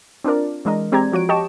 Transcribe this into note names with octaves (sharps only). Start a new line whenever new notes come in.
C4 D4 F4 A#4 D5
E3 G#3 D4 A#4 D#5
G#3 C4 G4 D5 A#5 G#6
F3 F#4 C#5 D7
G4 D#5 G5 A5 C#6 E7